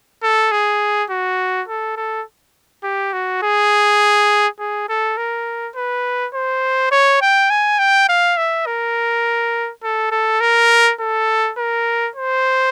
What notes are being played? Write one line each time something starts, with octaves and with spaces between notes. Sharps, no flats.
A4
G#4
F#4
A4
A4
G4
F#4
G#4
G#4
A4
A#4
B4
C5
C#5
G5
G#5
G5
F5
E5
A#4
A4
A4
A#4
A4
A#4
C5